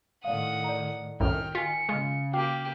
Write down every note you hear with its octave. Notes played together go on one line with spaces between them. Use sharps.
A2 D#3 D5 F5 F#5 D#6
D5 A#5
C2 F#2 A2 D#3 G5 F6
F4 G#5 B6 C#7
C#3 G#3 F4
A#3 F#4 G4 F5 G5 D6